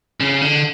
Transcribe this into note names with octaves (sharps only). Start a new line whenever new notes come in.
C#3
D3